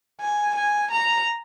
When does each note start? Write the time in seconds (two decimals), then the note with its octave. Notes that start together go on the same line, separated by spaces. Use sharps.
0.21 G#5
0.55 G#5
0.91 A#5